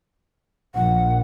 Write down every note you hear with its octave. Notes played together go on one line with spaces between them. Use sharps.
A#1 F#5